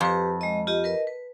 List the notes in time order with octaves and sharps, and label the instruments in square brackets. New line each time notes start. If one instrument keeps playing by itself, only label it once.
[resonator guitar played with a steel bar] F2 [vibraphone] G4 B4
[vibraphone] G#3 D#5
F4 G4 D#5
A#4 B4 D#5
B4